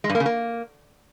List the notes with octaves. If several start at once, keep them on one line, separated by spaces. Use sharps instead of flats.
G#3
G2
A#3
C#3
A#3